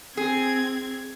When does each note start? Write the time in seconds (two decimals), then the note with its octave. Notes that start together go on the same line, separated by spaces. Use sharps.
0.17 C4 G#4 G#6